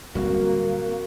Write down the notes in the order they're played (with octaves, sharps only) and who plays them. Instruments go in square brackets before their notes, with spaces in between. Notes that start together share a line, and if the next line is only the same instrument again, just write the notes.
[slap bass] D1 G3 C4 [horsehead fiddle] A#3 [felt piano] F#4